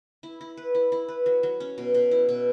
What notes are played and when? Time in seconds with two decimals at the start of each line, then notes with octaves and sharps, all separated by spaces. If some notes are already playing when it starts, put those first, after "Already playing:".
0.23 E4
0.41 E4
0.57 B4
0.75 E4
0.92 E4
1.09 B4
1.26 F#3
1.43 F#3
1.60 C#4
1.78 B2
1.94 B2
2.11 E4
2.29 B2